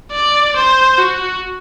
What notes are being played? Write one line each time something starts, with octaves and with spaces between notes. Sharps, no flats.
D5
C5
F#4